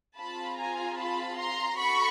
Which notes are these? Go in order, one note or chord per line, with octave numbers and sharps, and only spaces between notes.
C4 F4 G#4 A5 B5
G#5 A#5
A5 B5
A#5 C6
F#4 A4 B5 C#6